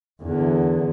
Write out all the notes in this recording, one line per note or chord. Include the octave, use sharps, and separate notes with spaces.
E2 D3